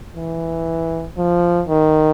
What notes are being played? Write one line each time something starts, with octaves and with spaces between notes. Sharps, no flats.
E3
F3
D#3